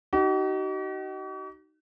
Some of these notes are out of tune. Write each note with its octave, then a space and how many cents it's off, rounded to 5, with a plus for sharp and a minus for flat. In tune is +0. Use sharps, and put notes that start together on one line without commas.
D#4 +0 F#4 +45